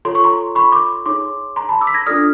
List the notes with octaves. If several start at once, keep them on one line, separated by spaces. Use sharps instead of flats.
F4 A4 C#5 C6
C#6
A#5 C6
B5 C#6
C6 D6
D#4 G#4 C#5 C6 D6
A#5 C6
A5 B5
D6 E6
B6
G#6 A#6
D4 F4 A4 D5 D#6 F6